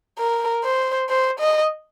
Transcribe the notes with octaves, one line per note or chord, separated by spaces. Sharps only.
A#4
C5
C5
D#5